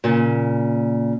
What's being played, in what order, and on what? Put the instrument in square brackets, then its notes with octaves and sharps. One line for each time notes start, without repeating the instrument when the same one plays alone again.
[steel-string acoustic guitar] A#2 C#3